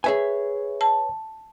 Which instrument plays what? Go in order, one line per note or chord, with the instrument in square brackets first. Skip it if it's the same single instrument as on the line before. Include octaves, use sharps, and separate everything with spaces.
[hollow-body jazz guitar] G#4 E5 G#5 [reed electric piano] B4 C#5
[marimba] A5